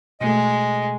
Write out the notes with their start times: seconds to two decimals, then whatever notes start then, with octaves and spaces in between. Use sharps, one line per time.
0.21 B2 G#3 A3 D#5